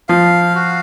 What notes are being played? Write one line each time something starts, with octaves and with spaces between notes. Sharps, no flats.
F3 F5
F#4